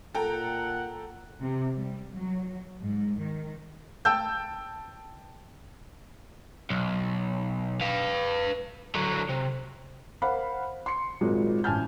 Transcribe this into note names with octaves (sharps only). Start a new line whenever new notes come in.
A#2 A4 F#5 G5 A#5
C3
G3
F#3
G#2
D#3
G5 A5 E6 G6
B1
B4 F5
D3 F#3
C3
A#4 C5 F5 F#5 B5
C6 C#7
G#1 A#2 F#3 G#3
A1 G#5 A5 F6 G6